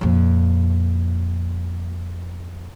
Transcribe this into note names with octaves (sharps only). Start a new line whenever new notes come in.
F2 A#2